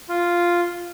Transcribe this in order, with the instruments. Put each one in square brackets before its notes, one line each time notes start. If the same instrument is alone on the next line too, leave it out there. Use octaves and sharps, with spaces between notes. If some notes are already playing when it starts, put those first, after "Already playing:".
[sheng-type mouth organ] F4